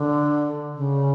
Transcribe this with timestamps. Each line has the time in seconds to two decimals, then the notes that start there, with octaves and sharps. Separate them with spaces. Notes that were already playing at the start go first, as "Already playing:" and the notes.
Already playing: D3
0.75 C#3